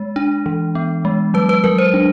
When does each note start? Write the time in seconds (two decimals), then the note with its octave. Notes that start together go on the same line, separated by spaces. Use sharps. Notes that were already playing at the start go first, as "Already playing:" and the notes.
Already playing: G#3
0.16 D4
0.46 E3
0.75 B3
1.05 G#3
1.34 F#3 B4
1.49 B4
1.64 F#3 A#4
1.78 C5
1.94 D4